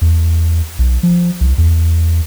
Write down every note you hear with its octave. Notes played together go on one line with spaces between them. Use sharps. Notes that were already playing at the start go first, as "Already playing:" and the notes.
E2
B1
F3
C2
E2